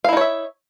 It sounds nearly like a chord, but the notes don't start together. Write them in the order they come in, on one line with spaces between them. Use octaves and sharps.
F5 E4 D#4 C#5 E5